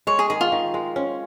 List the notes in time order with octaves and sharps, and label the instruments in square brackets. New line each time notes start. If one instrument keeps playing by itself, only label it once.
[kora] G#3 [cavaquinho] C#5
[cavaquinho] G#4
[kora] D#3 [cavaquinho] G#4
[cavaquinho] F4
[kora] D#3
G#3
C#4